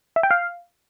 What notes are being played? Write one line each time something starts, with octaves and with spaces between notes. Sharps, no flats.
E5
G5
F5